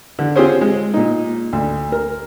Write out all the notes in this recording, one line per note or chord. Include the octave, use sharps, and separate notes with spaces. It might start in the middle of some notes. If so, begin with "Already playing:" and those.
D3
C4 F4 G4 G#4 C5 C#5
G#3
A#2 D#4
D2
A#4